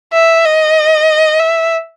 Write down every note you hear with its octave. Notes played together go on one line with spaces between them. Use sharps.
E5
D#5
E5